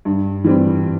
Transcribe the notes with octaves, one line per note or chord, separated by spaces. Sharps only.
G2
E3 G3 C4